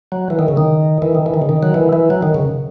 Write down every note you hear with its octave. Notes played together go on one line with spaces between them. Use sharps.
F#3
E3
D#3
C#3
D#3
E3
D#3
E3
D#3
C#3
D#3
F#3
E3
E3
F#3
D#3
C#3